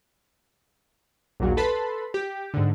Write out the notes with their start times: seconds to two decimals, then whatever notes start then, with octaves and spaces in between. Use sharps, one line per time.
1.40 A#1 D#2 A#2 F#3
1.57 A4 B4 A5 B5 C6
2.14 G4
2.54 G#2 D3